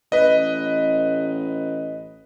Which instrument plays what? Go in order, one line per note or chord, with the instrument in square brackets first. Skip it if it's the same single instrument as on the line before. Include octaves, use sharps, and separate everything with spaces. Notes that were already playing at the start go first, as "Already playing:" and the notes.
[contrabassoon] A1 [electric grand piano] B4 D#5